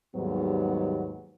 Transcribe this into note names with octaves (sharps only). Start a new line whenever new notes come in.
D#2 G#2 F#3 G3 B3